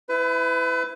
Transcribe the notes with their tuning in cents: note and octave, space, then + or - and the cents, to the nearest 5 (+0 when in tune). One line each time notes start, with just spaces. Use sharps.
E4 +0 B4 +35